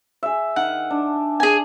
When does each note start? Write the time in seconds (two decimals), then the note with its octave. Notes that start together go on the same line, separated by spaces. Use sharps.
0.23 G#4 E5
0.56 D#3 F#5
0.90 D4
1.40 G#4 G#5